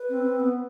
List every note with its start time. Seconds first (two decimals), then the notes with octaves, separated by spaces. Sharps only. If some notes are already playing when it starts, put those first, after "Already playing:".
Already playing: B4
0.09 C4
0.23 C4
0.40 B3